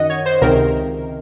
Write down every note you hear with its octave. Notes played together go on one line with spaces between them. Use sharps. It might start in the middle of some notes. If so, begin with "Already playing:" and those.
Already playing: F#2 D#3 D#5 F#5
C#5
C5
C#2 C3 D#3 A#4